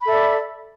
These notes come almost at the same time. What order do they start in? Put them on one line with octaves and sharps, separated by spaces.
B5 A4 E5 D5